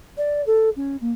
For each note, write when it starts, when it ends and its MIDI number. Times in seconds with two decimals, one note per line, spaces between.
0.17 0.42 74
0.46 0.69 69
0.76 0.96 61
1.01 1.12 58